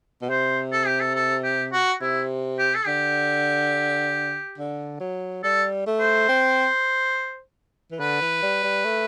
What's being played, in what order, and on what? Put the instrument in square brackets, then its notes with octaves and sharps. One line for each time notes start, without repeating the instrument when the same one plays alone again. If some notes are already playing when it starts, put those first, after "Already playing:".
[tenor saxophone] B2
[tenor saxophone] C3 [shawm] C5
[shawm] A4
G4
A4
A4
G4
F#4
[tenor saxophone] C3 [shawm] E4
[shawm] G4
A4
[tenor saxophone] D3 [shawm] G4
[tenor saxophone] D3
F#3
[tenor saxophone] G3 [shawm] A4
[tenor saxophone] A3
[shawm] C5
[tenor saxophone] C4
E3
[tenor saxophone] D3 [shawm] B4
[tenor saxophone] E3
G3
G3
A3